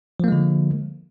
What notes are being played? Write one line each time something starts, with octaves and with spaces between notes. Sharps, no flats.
D3 F3 G#3 A#3